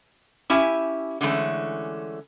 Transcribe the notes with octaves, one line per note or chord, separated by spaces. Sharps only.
C#4 E4 G4 E5 G#5
D3 E3 G#3 A3 C#4